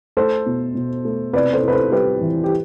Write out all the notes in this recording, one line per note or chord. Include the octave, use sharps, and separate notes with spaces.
A3 A4 C5
B2
B2
A3
C3 B4 D5
A4 C5
C3 B4
A4 C5
G3 G4 B4
E3
G4